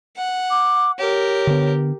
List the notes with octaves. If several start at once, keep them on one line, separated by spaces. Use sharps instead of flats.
F#5
D6
G4 A#4 C#5
D3 B3